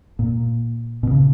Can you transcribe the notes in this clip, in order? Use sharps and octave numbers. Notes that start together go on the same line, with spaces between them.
A#2
B2
C#3